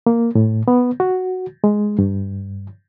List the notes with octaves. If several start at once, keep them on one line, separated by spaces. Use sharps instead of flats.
A#3
A2
B3
F#4
G#3
G2